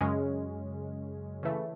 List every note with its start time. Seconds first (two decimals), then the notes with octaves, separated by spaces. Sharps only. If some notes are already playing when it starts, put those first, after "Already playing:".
0.01 F#2 C#3 G#3 C#4
1.43 C#3 E3 A3